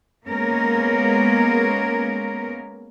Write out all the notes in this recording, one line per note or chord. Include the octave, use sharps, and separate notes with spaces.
G#3 A#3 B3 C#4 A#4